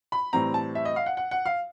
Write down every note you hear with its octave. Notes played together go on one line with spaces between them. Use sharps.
B5
A2 E3 G3 C4 A#5
A5
E5
D#5
F5
F#5
F#5
F#5
F5